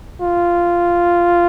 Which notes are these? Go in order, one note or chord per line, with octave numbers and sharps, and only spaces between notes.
F4